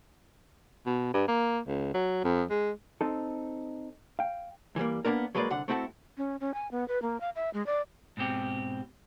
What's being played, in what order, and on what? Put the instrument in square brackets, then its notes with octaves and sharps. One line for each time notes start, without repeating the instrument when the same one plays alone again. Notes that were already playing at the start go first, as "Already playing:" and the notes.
[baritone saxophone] B2
G2
A#3
C#2
F#3
F2
G#3
[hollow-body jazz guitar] C4 D#4 A4
F5 G5
E3 F#3 G3 A#3
A#3 B3 C#4 D4 A#4
F#3 G#3 A#3 B4 D5
C2 D3 F#5
A3 C4 E4 F#4 G#4 A4
[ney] C#4
C#4
G#5
B3
B4
A#3
F5
E5
G#3
D5
[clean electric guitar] G#2 B2 C4 G4